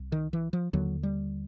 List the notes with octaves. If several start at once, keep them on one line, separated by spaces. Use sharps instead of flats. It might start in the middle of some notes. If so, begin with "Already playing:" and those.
Already playing: C2
D#3
E3
F3
D#2 D3 F#3
G3